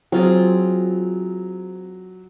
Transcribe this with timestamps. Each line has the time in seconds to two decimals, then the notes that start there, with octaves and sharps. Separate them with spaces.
0.12 F#3 C4 F4 G#4